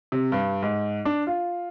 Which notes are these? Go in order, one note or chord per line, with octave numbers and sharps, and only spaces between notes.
C3
G2
G#2
D4
F4